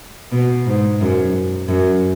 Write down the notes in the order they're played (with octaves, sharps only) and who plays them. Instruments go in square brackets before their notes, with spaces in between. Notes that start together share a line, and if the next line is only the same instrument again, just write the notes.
[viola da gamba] B2
G#2
F#2
F#2